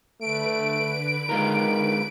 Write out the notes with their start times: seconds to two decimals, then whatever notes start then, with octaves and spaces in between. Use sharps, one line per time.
0.21 D3 A3 B4 D7
1.29 D#3 G#3 F4 A#4